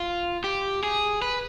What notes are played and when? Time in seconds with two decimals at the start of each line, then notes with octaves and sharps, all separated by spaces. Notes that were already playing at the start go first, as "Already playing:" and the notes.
Already playing: F4
0.44 G4
0.83 G#4
1.22 B4